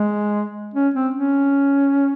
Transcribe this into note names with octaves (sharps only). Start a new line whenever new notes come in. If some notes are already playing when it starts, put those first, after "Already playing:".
Already playing: G#3
C#4
C4
C#4